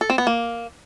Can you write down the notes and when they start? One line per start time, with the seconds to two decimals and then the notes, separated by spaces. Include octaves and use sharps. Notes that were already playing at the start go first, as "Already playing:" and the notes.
0.01 A4
0.10 C4
0.18 B3
0.27 A#3